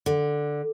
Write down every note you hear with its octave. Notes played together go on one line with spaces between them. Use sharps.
D3